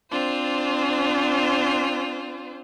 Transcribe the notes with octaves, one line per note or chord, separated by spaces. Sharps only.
C4 D4 F4 C5